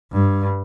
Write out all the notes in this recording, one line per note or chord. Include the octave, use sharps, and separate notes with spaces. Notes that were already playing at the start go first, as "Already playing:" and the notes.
G2